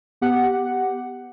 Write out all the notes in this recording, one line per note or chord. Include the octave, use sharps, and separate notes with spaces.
B3 G4 F#5